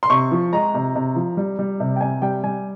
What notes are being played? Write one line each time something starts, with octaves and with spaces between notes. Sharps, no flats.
C6
C3 C#6
F3
G#3 A#5
C3
C3
F3
G3
G3
C3
G5
C3 G#5
G3 G5
G3 G#5